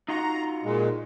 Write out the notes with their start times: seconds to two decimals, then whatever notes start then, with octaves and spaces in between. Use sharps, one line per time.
0.09 D#4 F4 F#4 A#5
0.64 A#2 G#3